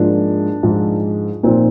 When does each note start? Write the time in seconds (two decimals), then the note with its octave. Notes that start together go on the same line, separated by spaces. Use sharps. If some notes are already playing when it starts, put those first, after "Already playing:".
Already playing: G#2 F3 A#3 D4
0.63 G#2 F3
1.43 A#2 F3 C4 D#4